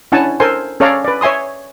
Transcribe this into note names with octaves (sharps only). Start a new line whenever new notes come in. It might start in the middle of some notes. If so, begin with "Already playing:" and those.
C#4 D4 E4 F#5 G#5 A5
A4 A#4 C5 G#5 C6
C#4 A4 C#5 D5 F5 A#5
B4 D5
C#5 E5 G#5 C6 D#6